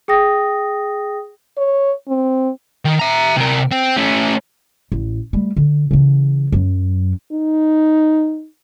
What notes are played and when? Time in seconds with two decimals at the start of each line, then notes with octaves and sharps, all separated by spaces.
0.08 G#4 G5 D#6 A#6
1.58 C#5
2.08 C4
2.85 D#3
2.99 E5 A#5
3.37 C3 A#4
3.71 C4
3.97 A3 C#4
4.92 A1
5.33 G3 A3
5.56 D3
5.91 C#3 E3
6.52 F#2 F#3
7.32 D#4